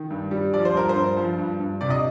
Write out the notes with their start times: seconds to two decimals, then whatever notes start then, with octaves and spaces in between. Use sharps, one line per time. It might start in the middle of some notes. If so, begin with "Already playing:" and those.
Already playing: D#3
0.10 G2
0.31 G3
0.53 F3 D5
0.65 C5
0.74 G2 A#4
0.89 C5
0.96 G2
1.17 F3
1.38 G2
1.60 G2
1.81 C3 D5
1.90 D#5